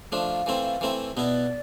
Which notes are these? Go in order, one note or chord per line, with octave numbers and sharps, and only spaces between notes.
F3 A3 D4 F5
E3 A3 C4 E4
E3 A3 C4 E4
B2 B3 E4 D5